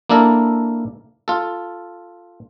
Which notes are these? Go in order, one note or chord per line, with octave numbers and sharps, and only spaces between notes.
A#3 D4 E4 A4 A#4
F4 A4